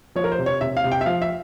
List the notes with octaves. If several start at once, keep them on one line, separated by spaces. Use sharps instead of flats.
F3 C#5
A#4
C5
C3
C#5
C3 E5
F5
C3
G5
E5
F3 F5
E5